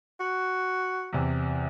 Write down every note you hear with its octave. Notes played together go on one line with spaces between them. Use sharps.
F#4
E2 C3